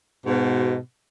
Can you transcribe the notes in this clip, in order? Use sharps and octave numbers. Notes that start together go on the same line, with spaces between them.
G#2 B2